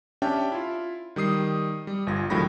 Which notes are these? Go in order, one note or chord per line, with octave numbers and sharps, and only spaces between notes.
C#4 D4 G4 E5 G5 A5
E4 F4
D#3 G3 D#6 C7
G3
G1 F4 A#6
C#2 A2 D#3 F#3 B5 A#6